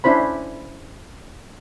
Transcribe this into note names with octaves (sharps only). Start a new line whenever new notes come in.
C#4 D4 E4 C5 B5